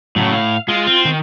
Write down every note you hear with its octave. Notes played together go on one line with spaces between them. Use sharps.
A2 C#3 F#3
F5
G#3 F4 F5
C4
D#3 G5